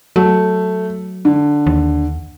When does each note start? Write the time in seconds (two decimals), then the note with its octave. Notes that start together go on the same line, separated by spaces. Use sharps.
0.16 F#3 A3
1.25 D3
1.67 D#2